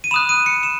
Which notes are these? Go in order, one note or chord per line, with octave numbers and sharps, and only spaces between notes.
D#7
B5 D#6 F#6 E7
D#7
C#7
E7